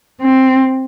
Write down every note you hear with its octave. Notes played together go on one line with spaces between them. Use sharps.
C4